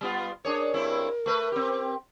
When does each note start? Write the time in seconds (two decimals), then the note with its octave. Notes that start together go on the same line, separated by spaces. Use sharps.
0.01 G3 B3 F4
0.45 D4 G#4 A#4 C#5
0.74 G2 C4 E4
1.26 A3 B4
1.52 C4 G4